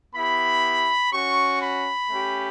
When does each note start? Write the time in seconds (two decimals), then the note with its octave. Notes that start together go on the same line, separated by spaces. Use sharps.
0.14 B3 E4 G4 B5
1.13 C#4 F#4 C#6
1.62 B5
2.10 A3 C#4 G4